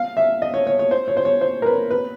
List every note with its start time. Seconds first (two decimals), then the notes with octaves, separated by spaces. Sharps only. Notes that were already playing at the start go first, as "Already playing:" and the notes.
Already playing: F5
0.17 E5
0.42 D#5
0.54 C#5
0.67 C#5
0.79 C#5
0.91 C5
1.08 C#5
1.17 C5
1.25 C#5
1.41 C5
1.62 A#4
1.66 B4
1.91 B4